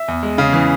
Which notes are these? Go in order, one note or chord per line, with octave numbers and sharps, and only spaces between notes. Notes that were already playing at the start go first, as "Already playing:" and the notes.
Already playing: E5
E2
G#3
C#3
E3